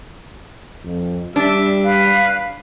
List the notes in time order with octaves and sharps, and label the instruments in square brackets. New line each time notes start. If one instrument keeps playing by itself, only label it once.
[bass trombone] F2
[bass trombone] G3 [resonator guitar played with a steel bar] D4 [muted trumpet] E5
[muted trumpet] B4 [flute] F5